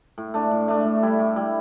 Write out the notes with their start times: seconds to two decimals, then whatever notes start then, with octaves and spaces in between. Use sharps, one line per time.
0.18 A2
0.34 A3 D4
0.51 A2
0.68 A3 D4
0.85 A2
1.02 G3 E4
1.19 A2
1.36 G3 E4